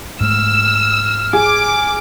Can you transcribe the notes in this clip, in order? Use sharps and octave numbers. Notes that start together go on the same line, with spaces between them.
G#2 G#3 A3 E6 F6
G#4 D6